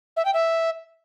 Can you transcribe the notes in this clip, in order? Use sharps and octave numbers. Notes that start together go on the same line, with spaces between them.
E5
G5
E5